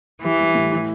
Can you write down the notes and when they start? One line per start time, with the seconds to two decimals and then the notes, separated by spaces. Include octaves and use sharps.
0.23 E3 G4
0.40 G3
0.55 A2
0.72 E4